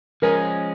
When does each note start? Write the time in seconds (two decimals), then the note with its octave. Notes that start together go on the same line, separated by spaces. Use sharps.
0.22 F3 G#3 C#4 G#4 A#4